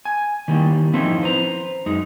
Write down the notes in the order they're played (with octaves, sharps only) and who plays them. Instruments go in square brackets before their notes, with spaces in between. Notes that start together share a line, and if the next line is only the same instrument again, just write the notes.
[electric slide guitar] G#5
D#3 E3 G3 A#3
F3 C4 C#4 D#4 E4
B4 C5 A#5
F#2 G#3 D#4